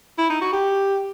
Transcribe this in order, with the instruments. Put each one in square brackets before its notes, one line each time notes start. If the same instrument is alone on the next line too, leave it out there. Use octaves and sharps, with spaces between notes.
[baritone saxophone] E4
D#4
F#4
G4